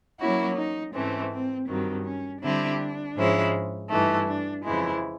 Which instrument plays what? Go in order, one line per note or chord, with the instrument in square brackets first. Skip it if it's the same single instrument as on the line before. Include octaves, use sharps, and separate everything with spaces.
[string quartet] F#3 A#3 C#4 F#4 [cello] E4
[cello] D#4
[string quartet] G#2 E3 A3 C4 [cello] C#4
[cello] C4
[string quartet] G2 D#3 F#3 [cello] C4
[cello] C#4
[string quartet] D3 G3 C4 E4 G4 [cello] D4
[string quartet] G#2 F3 G#3 C#4 E4
[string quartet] G2 E3 A3 [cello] D#4
[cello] D4
[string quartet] F2 C#3 E3 G#3 [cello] E4